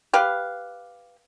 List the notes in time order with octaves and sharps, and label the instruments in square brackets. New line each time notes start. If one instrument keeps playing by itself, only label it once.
[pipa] G4 B4 F5